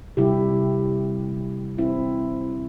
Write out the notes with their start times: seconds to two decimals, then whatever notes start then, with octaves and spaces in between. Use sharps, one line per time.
0.17 C3 G3 E4 G4
1.78 C4 E4